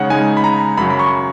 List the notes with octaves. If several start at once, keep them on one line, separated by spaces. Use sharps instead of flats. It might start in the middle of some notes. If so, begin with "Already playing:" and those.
Already playing: C#3 G#3 D#4 C#5 F#5
C#3 G#3 D#4 G#5
B5
A#5
F#2 C#3 F#3 B5
B5
C#6